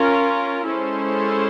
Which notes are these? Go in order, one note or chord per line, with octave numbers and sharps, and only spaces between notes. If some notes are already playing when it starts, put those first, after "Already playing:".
Already playing: C#4 F4 A#4
G#3 C#4 E4 A4 C5